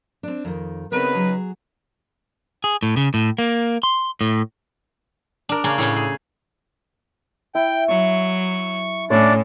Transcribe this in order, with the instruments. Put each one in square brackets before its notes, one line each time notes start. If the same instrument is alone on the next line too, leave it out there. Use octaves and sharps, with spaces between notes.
[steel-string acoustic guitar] C4 D4
F2 D#3
[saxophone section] C#3 D#4 B4 [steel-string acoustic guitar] B3 C4 A#4
[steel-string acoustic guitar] F#3 G#4
[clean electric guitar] G#4
A2
C#3
A2
A#3
C6
A2
[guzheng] D4 A#4
C#3 A#3 C#4
A2 C#3 C#4
G#4
[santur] E4 [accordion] G5
[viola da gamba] F#3 [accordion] C#6
[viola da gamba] A2 [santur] C#4 C#5 [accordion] D4 D5